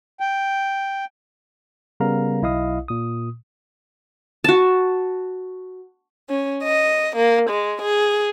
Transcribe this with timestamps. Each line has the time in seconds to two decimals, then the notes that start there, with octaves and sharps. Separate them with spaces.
0.20 G5
2.00 C#3 G3 B3 A#4 F5 A#5
2.42 B1 E4 D#5 F5 D#6
2.88 A#2 D#6
4.44 F#4 A5
6.29 C#4
6.63 D#5
7.16 A#3
7.50 G#3
7.82 G#4